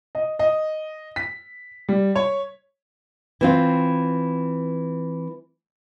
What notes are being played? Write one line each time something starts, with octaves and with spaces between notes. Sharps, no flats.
D#5
D#5
B6
G3
C#5
E3 C4 F4